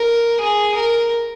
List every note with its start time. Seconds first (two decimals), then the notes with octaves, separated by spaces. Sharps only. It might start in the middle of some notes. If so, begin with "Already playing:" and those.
Already playing: A#4
0.40 G#4
0.75 A#4